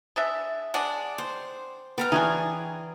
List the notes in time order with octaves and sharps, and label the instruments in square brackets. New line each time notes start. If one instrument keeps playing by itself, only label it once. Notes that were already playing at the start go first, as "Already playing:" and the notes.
[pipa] G#3 D4 E5
[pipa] G#3 D4 [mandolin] D5 F#5
[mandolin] C5 [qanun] G5
[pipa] G3 [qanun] B3 [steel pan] B4 [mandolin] G5 A#5 F6
[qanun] E3 D5 C6 [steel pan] D4 G#5 [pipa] D#4 F#4 G#4